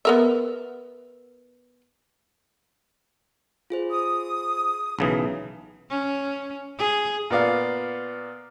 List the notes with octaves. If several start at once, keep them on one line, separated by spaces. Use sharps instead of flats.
B3 A#4 E5
F4 G#4 C5
D#6
B1 C#3 E3
C#4
G#4
A#2 B3 D5 F5